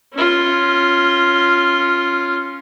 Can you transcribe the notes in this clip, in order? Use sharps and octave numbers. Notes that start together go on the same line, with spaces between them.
C#4 F4